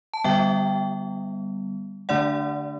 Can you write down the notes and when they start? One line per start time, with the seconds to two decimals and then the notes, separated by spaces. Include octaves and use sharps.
0.14 A5
0.24 D3 G3 B3 E5 G5
2.09 D3 A3 D4 D5 F#5